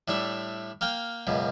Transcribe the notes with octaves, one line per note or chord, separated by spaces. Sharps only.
A2 G3 D4 E5
A#3 F5 G5
C#2 F#2 B2